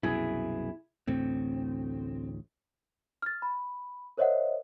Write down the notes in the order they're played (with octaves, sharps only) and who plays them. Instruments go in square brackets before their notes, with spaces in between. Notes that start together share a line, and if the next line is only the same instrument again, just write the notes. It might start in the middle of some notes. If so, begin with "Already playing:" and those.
[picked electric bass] C2 F#2 B2 [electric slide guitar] E4 G#4
[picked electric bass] A1 D2 A2 [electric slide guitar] C4
[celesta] F6 A6
B5
A#4 C5 C#5 D#5 E5 F#5